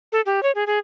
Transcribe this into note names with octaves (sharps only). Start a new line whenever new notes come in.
A4
G4
C#5
G#4
G#4